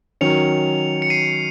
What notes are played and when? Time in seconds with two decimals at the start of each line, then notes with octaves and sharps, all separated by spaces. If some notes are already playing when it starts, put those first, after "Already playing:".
0.21 D#3 F#3 C#4 C#7 F7
1.02 C#7
1.10 C7 D#7